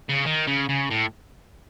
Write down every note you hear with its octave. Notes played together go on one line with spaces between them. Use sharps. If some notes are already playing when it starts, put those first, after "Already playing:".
C#3
D#3
C#3
C#3
A2